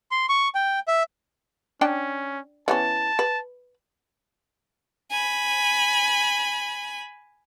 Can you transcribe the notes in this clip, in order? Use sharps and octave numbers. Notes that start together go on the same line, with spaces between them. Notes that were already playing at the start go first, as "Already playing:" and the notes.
C6
C#6
G5
E5
C#4 D4 G5 A5
E3 B3 C#4 A5
B4
G#5 B5